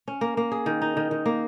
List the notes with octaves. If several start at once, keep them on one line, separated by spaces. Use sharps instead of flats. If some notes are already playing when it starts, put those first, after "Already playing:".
C#4
A#3
A#3
G#4
D#3
D#4
D#3
D#3
A#3